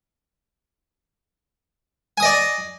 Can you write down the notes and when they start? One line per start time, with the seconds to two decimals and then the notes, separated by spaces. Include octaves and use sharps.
2.18 G#5
2.20 D#6
2.23 D#5
2.25 D5